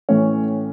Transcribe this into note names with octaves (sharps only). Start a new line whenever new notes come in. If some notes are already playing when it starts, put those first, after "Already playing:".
A2 E3 A3 C#4 C#5